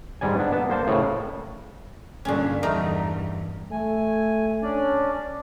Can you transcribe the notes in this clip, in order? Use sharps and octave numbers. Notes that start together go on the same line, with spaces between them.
G#2 G3 D5 G#5
B3 D4
B3 A5
A#3 C5 A5
A2 C#3
G2 A#2 D3 C#4
E2 G2 A3 D#4 A#4
A3 G#5
C#4 D4 D5